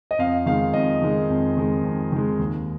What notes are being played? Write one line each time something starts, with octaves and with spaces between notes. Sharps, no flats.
D#5
F2 F5
D#3 G#3 F5
F2 D#5
D#3 G#3
F2
D#3 G#3
F2
D#3 G#3
D#2